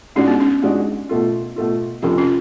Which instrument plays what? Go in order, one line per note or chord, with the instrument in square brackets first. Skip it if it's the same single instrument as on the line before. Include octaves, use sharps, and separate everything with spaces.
[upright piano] G#2 G#3 D4 F#4 [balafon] C#4
[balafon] B3
C#4
[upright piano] G#2 G#3 D4 F#4
B2 A3 F4
B2 A3 F4
[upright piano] F1 F2 F3 [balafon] C#4
[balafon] C#4 F4